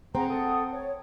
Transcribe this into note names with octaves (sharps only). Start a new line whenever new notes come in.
C4 G#4 F#5 A#5
A4 F#5 D#6
C#5